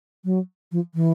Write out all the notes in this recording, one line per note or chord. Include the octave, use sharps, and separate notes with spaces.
F#3
F3
E3